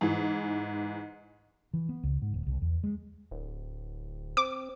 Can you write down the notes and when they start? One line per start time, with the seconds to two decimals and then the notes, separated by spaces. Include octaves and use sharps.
0.01 G#2 E3
1.74 E3
1.89 B3
2.03 C#2
2.22 G#2
2.34 D#1
2.47 C2
2.62 E2
2.84 G#3
3.31 D1
4.37 C4 D6